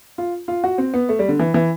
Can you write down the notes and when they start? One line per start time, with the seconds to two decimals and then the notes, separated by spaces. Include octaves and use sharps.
0.18 F4
0.48 F4
0.64 F#4
0.78 C4
0.94 B3
1.09 A3
1.19 G3
1.29 D3
1.39 E3
1.54 E3